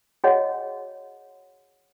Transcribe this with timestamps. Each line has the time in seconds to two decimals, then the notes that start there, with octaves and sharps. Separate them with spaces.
0.24 F#4 G#4 C#5 D#5 F#5